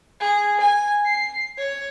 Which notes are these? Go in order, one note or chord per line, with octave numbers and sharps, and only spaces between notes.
G#4
G#5
C7
C#5